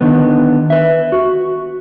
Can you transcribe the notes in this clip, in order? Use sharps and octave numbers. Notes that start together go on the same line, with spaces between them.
D3 D#3 B3
B4 E5
F#4